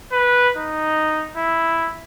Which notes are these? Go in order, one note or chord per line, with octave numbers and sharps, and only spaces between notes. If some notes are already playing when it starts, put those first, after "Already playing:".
B4
D#4
E4